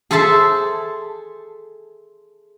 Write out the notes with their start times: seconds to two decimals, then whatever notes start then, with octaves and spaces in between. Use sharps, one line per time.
0.11 G#4 A4 C5 E5 A5